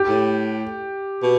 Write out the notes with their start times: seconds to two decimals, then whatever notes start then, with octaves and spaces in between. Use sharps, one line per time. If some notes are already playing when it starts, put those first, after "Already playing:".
Already playing: G4
0.08 A2
1.23 B2